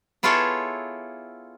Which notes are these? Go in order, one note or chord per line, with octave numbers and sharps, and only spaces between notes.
B3 E4 F4 G#4 A4 C#5